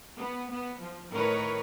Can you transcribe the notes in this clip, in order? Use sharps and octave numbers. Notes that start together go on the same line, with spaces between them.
B3
B3
F3
A2 D#3 A#4 B4 C#5